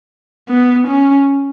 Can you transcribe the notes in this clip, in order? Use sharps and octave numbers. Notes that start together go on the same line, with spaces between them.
B3
C#4